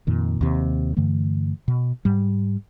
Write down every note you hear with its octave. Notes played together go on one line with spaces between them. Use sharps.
F2 A#2 D#3
D#2 C3
G2 D3 E3 A3
B2
G#2 G3